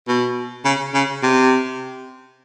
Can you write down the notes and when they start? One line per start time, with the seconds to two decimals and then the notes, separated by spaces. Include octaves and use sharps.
0.08 B2
0.65 C#3
0.94 C#3
1.23 C3